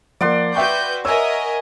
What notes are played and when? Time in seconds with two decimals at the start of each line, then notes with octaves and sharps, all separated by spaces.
0.21 F3 A#3 D5 F#5 C6
0.55 F#4 B4 E5 G5 C#6 G6
1.05 A#4 C#5 D#5 E5 G#5 E6